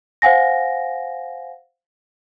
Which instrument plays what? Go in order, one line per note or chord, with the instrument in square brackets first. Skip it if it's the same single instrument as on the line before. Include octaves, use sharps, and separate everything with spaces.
[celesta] C5 F5 F#5 G#5 A#6